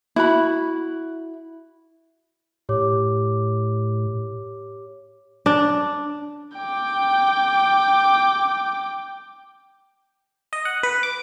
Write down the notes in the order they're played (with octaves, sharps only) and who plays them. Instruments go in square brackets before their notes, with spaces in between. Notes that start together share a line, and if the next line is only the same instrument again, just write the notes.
[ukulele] E4 F#4 B5
[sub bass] A2 [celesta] G4 C#5 D6
[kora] D4
[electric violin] G5 D6
[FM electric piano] D#5
F#5
B4
D6